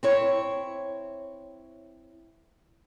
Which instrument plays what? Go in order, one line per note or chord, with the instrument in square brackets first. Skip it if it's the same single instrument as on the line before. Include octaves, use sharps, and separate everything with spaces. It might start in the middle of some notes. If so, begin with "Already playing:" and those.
[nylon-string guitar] C4 E4 C#5